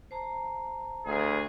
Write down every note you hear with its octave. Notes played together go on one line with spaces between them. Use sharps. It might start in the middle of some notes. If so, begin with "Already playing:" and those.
C5 A5 A#5
D2 G#4